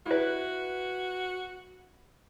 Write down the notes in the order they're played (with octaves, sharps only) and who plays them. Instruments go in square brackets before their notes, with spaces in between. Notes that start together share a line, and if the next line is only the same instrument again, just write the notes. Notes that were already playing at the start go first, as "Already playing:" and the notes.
[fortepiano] E4 B4 [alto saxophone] F#4